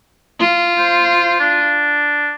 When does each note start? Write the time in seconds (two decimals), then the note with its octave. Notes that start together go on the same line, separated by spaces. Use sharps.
0.40 F4
0.79 C5
1.40 D4